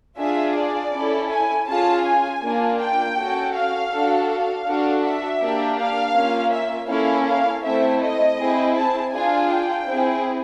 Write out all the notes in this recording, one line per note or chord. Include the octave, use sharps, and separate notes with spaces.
D4 F4 G#4 E5
D5
C#4 E4 A4
G#5
C#4 F4 G#4 A5
G#5
A#3 D4 F4
G5
C#4 F#4 A4
F5
D4 F#4 A4
F5
D4 F#4 A4
E5
A#3 D4 G4
F5
A#3 C#4 F4
E5
A#3 C#4 E4 A4 F5
F5
A3 C4 E4 E5
D#5
C4 E4 G#4
A5
D4 F4 G#4 G#5
G5
C4 E4 G#4